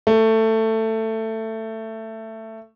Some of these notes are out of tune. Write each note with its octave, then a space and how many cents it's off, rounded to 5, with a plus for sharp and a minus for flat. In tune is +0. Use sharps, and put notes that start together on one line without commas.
A3 +15